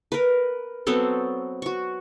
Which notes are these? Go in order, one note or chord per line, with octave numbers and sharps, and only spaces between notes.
A#4 B4
F#3 B3 C4 A4
F#4 C#6